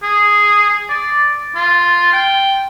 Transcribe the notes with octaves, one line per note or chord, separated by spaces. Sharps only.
G#4
D5
F4
G5